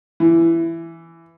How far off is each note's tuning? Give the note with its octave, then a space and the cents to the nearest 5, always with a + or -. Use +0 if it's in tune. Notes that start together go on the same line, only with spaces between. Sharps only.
E3 +10